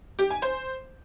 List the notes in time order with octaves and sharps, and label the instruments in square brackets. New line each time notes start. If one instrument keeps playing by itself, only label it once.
[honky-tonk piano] G4
G#5
C5